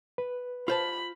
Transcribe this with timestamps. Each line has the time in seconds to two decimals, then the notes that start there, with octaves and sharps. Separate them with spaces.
0.18 B4
0.68 F4 C5 A5 B5